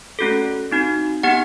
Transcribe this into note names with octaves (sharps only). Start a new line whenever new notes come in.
A3 C#4 F#4 A4
C4 D#4 F#4
B3 D#4 G4 F#5